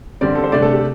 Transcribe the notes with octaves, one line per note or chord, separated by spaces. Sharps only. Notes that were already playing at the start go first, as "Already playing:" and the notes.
D3 G3 C4 D5
A4
C5
C3 A3 D4 D5
A4
G4